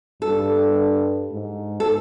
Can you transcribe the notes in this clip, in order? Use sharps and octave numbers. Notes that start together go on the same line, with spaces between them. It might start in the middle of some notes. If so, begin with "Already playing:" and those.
G2 A4
G#2
A4